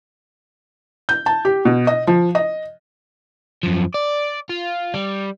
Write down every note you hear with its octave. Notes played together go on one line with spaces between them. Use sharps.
G6
A5
G4
B2
D#5
F3
D#5
F#2 F3
D5
F4
G3